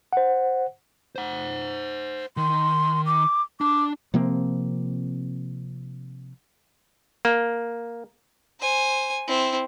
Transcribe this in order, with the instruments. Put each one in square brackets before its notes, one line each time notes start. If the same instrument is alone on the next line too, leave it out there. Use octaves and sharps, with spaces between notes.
[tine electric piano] C5 F#5
[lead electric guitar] C5 F#5
[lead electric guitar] D#3 [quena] C6
[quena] D6
[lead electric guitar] D4 [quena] D6
[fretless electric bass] C3 F3 A#3 C4
[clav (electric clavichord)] A#3
[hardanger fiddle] C5 G#5
C4 E4